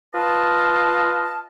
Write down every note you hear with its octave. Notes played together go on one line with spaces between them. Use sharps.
F4 B4 D#5 F5 A5